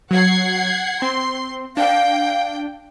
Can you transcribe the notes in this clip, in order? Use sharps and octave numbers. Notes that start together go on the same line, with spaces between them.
F#3 F#5 G#6 C7
C4 C6
D4 F5 G5